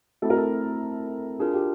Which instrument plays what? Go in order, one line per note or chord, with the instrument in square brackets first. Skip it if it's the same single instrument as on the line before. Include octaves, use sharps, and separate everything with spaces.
[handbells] A3 C4 E4 [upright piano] A4
[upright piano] A#4
A4
[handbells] D4 F4 A#4 [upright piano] G#4
[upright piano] G4